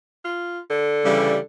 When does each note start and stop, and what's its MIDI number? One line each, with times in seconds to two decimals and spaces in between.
0.25 0.59 65
0.70 1.42 50
1.04 1.37 49
1.04 1.37 52
1.04 1.37 55